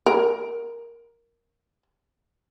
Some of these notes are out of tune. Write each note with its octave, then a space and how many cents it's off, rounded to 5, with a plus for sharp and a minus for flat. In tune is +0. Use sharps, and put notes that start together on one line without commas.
A#4 +5